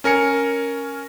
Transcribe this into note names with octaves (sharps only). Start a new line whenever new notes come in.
C#4 A#4 G#5 C#7